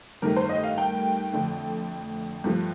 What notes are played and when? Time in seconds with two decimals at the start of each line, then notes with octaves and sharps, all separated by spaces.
0.22 G2 D#3 A3 A#4
0.36 C5
0.49 D#5
0.64 F5
0.78 G5
1.33 F2 D3 A3
2.44 G2 F3 A3